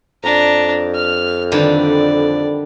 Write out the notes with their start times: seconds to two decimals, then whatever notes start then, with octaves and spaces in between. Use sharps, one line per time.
0.23 F2 D4 A#5
0.95 F6
1.52 D3 D#3 G3 D5